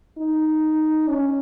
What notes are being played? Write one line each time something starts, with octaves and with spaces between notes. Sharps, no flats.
D#4
C#4